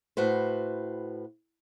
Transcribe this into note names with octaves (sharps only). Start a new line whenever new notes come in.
A2 F#4 B4 C5